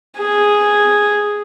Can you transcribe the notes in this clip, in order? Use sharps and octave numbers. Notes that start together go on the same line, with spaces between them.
G#4